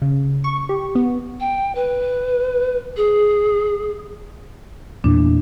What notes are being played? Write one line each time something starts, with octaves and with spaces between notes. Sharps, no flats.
C#3
C#6
G4
B3
G5
B4
G#4
E2 A#2 E3 D4